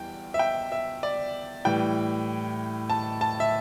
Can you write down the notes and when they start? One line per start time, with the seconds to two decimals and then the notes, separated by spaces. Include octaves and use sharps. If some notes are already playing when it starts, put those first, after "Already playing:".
Already playing: E2 E3 G3 G5
0.34 E5
0.39 G5
0.72 E5
1.03 D5
1.65 A2 E3 G3 G5
2.90 A5
3.21 A5
3.40 E5